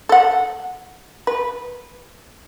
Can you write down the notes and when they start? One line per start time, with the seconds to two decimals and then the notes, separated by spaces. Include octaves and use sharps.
0.09 A4 F#5
1.27 B4